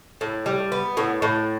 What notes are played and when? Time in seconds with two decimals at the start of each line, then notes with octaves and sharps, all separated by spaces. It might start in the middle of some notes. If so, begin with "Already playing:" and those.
0.21 A2
0.46 G3
0.72 B3
0.97 A2
1.22 A2